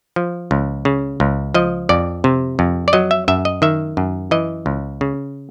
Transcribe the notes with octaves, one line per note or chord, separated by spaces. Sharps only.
F3
C#2
C#3
C#2
F3 D#5
F2 D5
C3
F2
D5
F#3 D#5
E5
F#2 E5
D#5
D#3 E5
F#2
E3 D#5
C#2
C#3